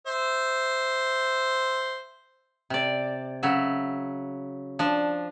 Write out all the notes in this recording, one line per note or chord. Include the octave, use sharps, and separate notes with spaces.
C5 E5
C3 D5
C#3 F#3 E5
F3 D4